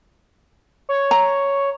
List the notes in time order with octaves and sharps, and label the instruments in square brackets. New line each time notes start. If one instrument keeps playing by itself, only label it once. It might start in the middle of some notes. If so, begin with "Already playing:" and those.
[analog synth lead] C#5
[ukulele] A#5